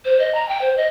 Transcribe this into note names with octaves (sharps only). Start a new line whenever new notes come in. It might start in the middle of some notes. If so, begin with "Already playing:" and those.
C5
D#5
A#5
G5
C5
D#5